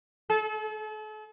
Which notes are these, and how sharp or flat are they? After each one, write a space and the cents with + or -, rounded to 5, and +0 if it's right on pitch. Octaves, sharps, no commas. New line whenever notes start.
A4 -40